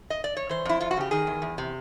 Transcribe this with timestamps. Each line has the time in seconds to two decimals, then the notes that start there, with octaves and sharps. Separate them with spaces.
0.10 D#5
0.24 D5
0.37 C#5
0.49 E3 C5
0.65 F2 E4
0.80 F2 F4
0.91 F#4
0.97 C#3 G4
1.11 D#3 G#4
1.27 E2
1.42 E2
1.58 C3